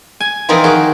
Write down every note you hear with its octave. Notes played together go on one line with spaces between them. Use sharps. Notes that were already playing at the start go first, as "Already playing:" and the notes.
G#5
E3 F3 C4 D#4 A#4
D#3 F#4 G#4